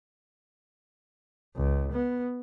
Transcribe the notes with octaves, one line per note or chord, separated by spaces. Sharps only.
C#2
B3